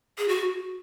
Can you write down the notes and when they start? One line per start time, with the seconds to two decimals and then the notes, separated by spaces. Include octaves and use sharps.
0.18 G#4
0.28 F#4